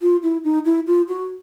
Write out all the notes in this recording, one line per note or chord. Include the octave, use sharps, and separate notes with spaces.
F4
E4
D#4
E4
F4
F#4